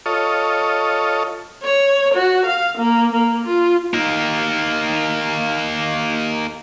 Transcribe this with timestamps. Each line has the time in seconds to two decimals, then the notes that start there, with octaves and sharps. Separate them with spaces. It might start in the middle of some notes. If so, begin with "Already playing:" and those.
0.06 F4 A4 C#5 D#5
1.63 C#5
2.14 F#4
2.46 F5
2.77 A#3
3.12 A#3
3.46 F4
3.94 A#3 D#4